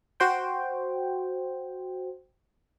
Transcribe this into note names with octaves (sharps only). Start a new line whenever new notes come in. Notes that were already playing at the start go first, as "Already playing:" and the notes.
F#4 C5 G5